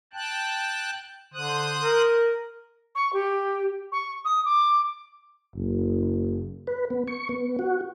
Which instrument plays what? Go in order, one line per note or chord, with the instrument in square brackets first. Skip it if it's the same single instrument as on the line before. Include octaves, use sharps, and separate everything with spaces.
[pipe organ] G5 A5 F#6
[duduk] D3 [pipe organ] C5 D#6 F#6
[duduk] A#4
[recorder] C#6
G4
C#6
D#6
D6
[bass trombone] F#1
[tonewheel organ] B4
B3
C#6
B3
F#4